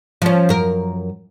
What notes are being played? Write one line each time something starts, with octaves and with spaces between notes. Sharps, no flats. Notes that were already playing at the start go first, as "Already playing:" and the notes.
F3 C#4
F#2 A#4